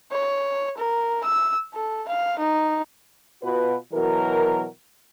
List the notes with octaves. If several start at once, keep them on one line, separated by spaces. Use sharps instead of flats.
C#5
A#4
E6
A4
F5
D#4
B2 F4 F#4 B4
B2 E3 F#3 A#4